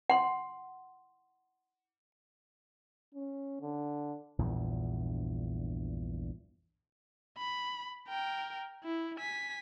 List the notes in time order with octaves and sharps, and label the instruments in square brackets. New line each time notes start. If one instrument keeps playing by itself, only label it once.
[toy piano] F#5 C6
[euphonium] C#4
D3
[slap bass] A#1 E2 G2 A#2
[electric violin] B5
A#4 G5
E4
G#5 B6